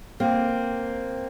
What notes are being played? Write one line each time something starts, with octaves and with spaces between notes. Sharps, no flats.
A#3 C4